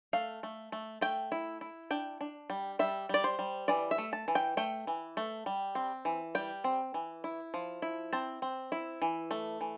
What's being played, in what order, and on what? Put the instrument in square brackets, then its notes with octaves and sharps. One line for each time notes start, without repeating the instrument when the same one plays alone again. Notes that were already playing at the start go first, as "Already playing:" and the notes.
[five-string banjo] A3 F5
A3
A3
A3 G5
E4
E4
D4 G5
D4
G3
G3 E5
G3 D5
C5
G3
E3 D5
E5
A3
A5
E3
G5
A3 G5
E3
A3
G3
C4
E3
G3 G5
C4
E3
E4
F3
E4
C4 A5
C4
E4
E3
A3
E3